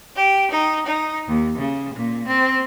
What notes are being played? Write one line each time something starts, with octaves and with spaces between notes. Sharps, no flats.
G4
D#4
D#4
D#2
C#3
A#2
C4